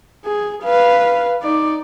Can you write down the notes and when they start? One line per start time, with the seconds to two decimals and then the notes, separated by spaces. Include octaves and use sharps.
0.25 G#4
0.63 B4 F5
1.42 D#4 D5